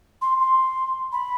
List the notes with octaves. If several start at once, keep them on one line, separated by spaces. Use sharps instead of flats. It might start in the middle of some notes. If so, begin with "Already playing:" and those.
C6
C6
B5